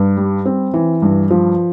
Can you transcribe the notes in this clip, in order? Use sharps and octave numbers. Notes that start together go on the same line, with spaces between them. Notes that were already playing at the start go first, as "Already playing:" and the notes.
Already playing: G2
G3
C4
E3
G2
F3